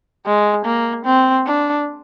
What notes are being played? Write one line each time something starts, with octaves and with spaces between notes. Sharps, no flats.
G#3
A#3
C4
D4